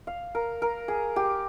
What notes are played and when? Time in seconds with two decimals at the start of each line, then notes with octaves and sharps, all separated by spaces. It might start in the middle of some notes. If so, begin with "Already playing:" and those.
0.07 F5
0.35 A#4
0.62 A#4
0.88 G#4
1.16 G4